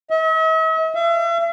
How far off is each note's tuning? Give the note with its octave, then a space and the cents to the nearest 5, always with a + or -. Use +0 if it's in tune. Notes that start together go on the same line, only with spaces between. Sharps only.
E5 -45
E5 +45